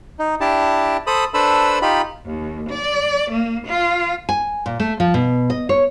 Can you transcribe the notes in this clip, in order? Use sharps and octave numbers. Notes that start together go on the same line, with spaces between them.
D#4
D4 E4 G4 A5
A4 C5 B5 D#6
D4 A4 B4 C5 B5 E6
D#4 F4 G4 B5
D#2
D5
A#3
F4
G#5
A#2
A3
F3
B2
D#5
C#5